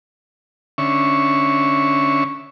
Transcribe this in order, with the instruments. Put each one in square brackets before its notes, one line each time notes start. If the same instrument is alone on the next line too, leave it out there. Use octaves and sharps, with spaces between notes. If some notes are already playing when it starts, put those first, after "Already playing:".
[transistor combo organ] D3 C#4 E5 C#6